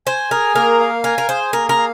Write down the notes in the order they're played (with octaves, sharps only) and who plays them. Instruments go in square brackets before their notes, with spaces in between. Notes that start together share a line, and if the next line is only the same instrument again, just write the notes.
[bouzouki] C5 [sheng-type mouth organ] G#5
[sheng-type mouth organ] G#4 [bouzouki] A#4
[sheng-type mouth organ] A#3 [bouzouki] A#4
[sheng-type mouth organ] F5
[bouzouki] A#4 [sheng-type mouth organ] G#5
[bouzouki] A#4
[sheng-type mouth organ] G#4 [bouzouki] C5
[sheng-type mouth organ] A#3 [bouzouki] A#4
[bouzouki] A#4
[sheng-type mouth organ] F5